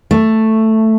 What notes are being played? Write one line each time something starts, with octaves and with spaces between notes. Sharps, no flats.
A3